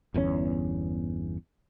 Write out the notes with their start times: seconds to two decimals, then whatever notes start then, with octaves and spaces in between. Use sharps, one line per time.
0.14 G1 E2 D3 C#4